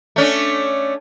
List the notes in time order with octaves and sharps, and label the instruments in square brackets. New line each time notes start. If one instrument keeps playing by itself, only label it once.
[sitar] A3 C#4 D4